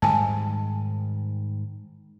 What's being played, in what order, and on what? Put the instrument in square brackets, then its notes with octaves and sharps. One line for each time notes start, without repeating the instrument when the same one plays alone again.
[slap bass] G#2 D#3 G3 [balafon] G#5 A5